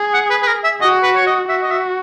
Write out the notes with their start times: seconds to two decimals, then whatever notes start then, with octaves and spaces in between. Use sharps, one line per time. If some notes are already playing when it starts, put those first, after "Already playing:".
Already playing: G#4
0.14 F#5
0.30 B4
0.43 B4
0.47 A#4
0.64 E5
0.81 F#4 D#5
1.03 B4
1.16 C#5
1.27 D#5
1.48 F#4 E5
1.63 D#5
1.71 E5